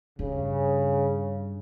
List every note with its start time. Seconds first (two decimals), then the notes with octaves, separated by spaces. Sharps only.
0.19 G2 C#3